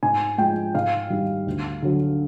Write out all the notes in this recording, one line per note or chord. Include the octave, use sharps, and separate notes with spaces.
G#2 G#5
F3 G#3 G5
G#2 F5
D#3 G3
D2
D3 F#3